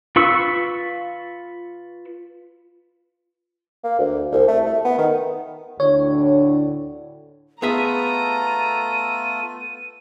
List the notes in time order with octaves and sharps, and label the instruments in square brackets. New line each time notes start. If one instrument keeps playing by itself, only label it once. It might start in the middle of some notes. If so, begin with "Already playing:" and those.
[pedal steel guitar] F4 B4 C#6 E6
[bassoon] A#3
D2
C2
A3
A3
B3
D#3
[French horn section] D2 A2 D3 [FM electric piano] C#5
[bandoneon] A3 F4 A4 [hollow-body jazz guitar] B3 G#4 E5 [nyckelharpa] A#5 [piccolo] D#7